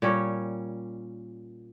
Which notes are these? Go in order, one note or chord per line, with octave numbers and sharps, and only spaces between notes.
A#2 G3 C#4 C#5